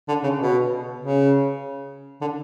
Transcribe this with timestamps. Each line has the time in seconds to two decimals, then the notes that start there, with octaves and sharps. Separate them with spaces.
0.08 D3
0.24 C#3
0.39 B2
0.99 C#3
2.21 D3